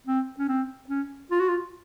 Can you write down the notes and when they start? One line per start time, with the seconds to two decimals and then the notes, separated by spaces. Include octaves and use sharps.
0.07 C4
0.39 C#4
0.49 C4
0.89 C#4
1.31 F4
1.40 F#4
1.49 F4